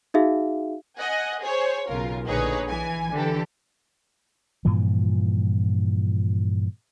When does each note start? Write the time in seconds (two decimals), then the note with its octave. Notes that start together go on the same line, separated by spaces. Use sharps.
0.14 D#4 F#4 G#4 E5 F5
0.98 D#5 F#5 G#5
1.41 G#4 C5 C#5
1.87 B1 C#3 F4 A#4
2.26 A#1 D3 D#4 G#4 B4 C#5
2.68 E3 G#5
3.12 D3 E3 D4 G4 A4
4.65 G2 A#2 E3 F3